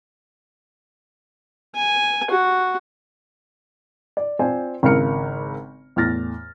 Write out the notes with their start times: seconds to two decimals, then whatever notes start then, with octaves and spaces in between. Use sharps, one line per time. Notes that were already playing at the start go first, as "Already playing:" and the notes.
1.76 G#5
2.31 F#4
4.17 D5
4.39 C4 F4 C5 D5 G#5 A5
4.83 G#1 C#3 E4 A#4 F6 C#7
5.96 E2 A2 F6 A6 A#6